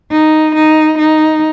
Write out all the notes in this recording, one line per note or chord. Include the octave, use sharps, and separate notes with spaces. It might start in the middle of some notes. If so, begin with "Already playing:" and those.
D#4
D#4
D#4